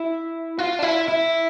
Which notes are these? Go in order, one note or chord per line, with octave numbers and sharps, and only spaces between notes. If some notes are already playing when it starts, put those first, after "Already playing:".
Already playing: E4
F4
D4
E4
E4